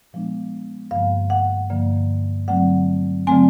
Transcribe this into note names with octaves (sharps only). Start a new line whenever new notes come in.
A#2 F3 G#3 B3 D4
G2 D3 F3 A#3 F5
F#5
G2 D3 F3 A#3
D3 F#3 A3 C4 F#5
D3 F#3 A3 C4 G#5